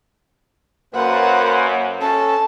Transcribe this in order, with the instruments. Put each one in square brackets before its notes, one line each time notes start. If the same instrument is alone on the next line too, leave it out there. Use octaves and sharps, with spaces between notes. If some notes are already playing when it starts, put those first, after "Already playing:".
[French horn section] F#2 [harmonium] A#3 B4 C5 [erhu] F#5
[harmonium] C#4 A4 [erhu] A5